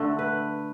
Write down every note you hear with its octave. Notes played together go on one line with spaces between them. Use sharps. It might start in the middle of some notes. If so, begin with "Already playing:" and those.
Already playing: D3 A3
B4